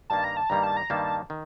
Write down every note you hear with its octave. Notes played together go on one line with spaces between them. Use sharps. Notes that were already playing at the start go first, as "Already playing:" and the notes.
G2 D#3 G3 A#3 A5
A#5
A5
G2 D#3 G3 A#3 A#5
A5
A#5
G2 D#3 G3 A#3 A5
D#3